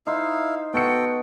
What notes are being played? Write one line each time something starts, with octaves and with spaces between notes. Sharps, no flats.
D#4 E4 C5 F5
B3 F#4 A4 G5 C#7